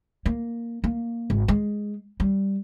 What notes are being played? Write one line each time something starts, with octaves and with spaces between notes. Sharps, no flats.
A#3
A#3
G#1
G#3
G3